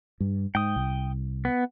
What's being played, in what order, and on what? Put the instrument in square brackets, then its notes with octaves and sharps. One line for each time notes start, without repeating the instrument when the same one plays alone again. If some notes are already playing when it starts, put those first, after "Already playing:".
[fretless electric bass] G2
[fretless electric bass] G#2 [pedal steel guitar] G5 D#6
[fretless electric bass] C2
[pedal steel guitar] B3